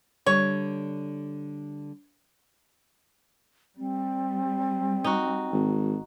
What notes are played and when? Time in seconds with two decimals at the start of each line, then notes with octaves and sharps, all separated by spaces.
0.26 D3 G3 C#5
3.77 G3 C4
5.04 D#4 F#4
5.52 G#1